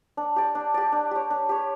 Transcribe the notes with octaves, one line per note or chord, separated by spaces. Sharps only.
D4
G4 D5
D4
G4 D5
D4
G4 C#5
D4
G4 C#5